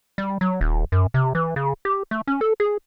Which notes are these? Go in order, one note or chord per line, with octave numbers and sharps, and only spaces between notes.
G3
F#3
D#1
F#2
C3
E3
C#3
G4
A3
C#4
A4
G#4